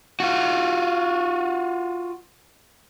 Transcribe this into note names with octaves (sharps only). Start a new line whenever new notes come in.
F4 F#4